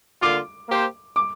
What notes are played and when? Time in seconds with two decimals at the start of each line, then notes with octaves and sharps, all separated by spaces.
0.22 D3 A#3 F4 D6
0.69 A#3 G4 C5
1.16 D6